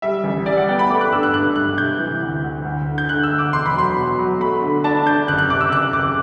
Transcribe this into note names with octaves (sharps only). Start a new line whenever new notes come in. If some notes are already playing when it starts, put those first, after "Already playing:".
G3 E5
A1
G3 D5
F#5
B3 G5
B5
A3 D6
F#6
G2 E6
F#6
G2 F#6
G2 F#6
C3 G6
E3
D2
D2
D2
D3
G6
D3 F#6
E6
D2
D6
E1 C6
B5
F#3 C6
B2
F#3
A3 B5
D3
D4 A5
D4 G6
F#1 F#6
F#6
C3 D6
E6
F#1 F#6
F#1 D6